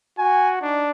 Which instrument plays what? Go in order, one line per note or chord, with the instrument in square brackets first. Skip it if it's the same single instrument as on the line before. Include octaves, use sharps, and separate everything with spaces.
[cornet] F#4 [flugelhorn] G#5
[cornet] D4 [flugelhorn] D#4